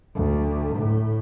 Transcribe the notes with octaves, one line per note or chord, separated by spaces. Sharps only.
D2
A2